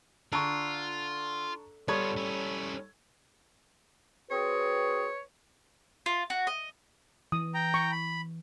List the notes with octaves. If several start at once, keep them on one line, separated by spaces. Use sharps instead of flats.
D3 F4 A5 A#5 C#6
G3 B3 F4 A4 C#5 G#6
C#4 E4
C4 F#4 G#4 B4 C#5
F4
F#4
D#5
E3 D#6
G5 A#5
C#6
B5